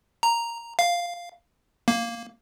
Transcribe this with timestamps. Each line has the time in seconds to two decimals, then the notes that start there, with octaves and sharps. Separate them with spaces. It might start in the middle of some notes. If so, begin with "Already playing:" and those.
0.23 A#5
0.79 F5
1.88 A#3